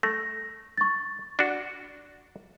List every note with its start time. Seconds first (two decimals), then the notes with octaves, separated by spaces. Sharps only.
0.03 A3 A#6
0.77 C#6 A6
1.39 D4 F#4